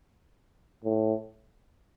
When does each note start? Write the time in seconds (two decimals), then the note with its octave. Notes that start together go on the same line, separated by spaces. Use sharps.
0.84 A2